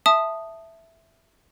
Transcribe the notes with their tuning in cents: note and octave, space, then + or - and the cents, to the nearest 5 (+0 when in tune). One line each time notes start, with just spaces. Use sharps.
E5 +0 A5 +0 D#6 -10